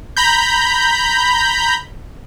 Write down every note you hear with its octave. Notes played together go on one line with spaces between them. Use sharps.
A#5 B5 G6